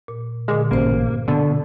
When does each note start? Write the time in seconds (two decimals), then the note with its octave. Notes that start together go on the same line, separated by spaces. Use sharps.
0.08 A#2
0.48 A#2 D3 G#3
0.71 A1 G2 A#3 C5
1.28 B2 D3